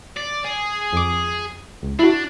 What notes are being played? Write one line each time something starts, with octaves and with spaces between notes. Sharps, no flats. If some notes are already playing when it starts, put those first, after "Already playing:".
D5
G#4
F2 D6
C#2
D4 E4 F#4